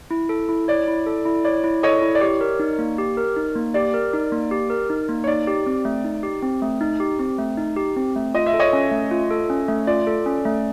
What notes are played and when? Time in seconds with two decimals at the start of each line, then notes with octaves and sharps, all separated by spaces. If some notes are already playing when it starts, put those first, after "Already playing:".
0.11 E4
0.29 A4
0.49 E4
0.68 C#5 D5
0.88 E4
1.06 A4
1.25 E4
1.44 C#5 D5
1.64 E4
1.83 A4 C#5 D#5
2.02 E4
2.15 D5
2.21 G4 C#5
2.41 A#4
2.59 D#4
2.79 A#3
2.98 G4
3.17 A#4
3.36 D#4
3.56 A#3
3.74 G4 D5
3.94 A#4
4.13 D#4
4.32 A#3
4.51 G4
4.70 A#4
4.90 D#4
5.09 A#3
5.24 C#5
5.27 D#4 D5
5.47 G4
5.66 C4
5.85 A3
6.04 D#4
6.23 G4
6.42 C4
6.62 A3
6.81 D#4
7.00 G4
7.19 C4
7.38 A3
7.57 D#4
7.76 G4
7.97 C4
8.16 A3
8.35 F4 D#5
8.46 E5
8.54 A4
8.59 C#5 D#5
8.73 C#4
8.92 A3
9.11 F4
9.31 A4
9.50 C#4
9.68 A3
9.87 F4 D5
10.07 A4
10.26 C#4
10.45 A3